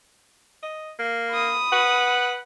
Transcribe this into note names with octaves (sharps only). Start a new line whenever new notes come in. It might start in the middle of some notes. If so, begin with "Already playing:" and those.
D#5
A#3
B5 D#6
B4 F#5